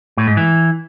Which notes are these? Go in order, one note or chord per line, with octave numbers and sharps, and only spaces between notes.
A2
G#2
E3